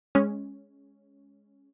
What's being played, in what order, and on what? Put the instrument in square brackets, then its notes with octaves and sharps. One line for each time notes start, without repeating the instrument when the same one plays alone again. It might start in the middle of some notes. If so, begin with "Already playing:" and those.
[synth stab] G#3 C#4